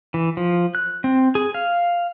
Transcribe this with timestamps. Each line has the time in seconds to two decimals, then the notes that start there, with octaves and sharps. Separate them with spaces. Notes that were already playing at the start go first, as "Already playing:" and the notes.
0.14 E3
0.37 F3
0.75 F#6
1.04 C4
1.35 G#4
1.54 F5